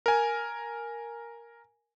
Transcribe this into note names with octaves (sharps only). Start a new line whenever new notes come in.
A#4 G#5